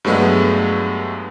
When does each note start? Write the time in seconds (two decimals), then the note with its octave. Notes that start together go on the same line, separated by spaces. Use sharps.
0.05 G2 F#3 G#3 A3 B3